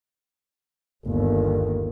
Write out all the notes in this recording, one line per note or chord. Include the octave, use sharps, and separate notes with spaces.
G1 D#2